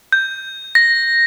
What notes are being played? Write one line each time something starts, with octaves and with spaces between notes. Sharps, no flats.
G6
A#6